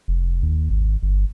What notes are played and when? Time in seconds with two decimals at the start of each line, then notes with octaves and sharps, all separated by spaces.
0.08 F1
0.43 D#2
0.70 G#1
1.03 G1